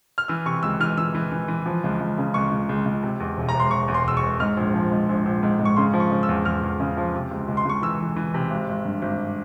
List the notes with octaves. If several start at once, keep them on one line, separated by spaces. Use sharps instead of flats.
F6
E3 E6
C3 C#6
C#2 E6
E3 F6
E3 E6
E3
E3
E3
F3
C#2
C#2
C#3
C#2 C#6
C#2
C#2
C#2
C3
E2
E1
A#5
E1
C6
E2 C#6
E2
C6
E1 E6
C#6
E1
G#2 F6
A#1
F3
G#2
A#1
A#1
G#2
G#2
C#6
C#3 C6
F3
C#6
C#3
E6
E2
E2 F6
E2
C#3
F3
C3
C#2
C#2
C6
C#2 C#6
E3 E6
E3
E3
C3
G#1
G#1
G2
G#1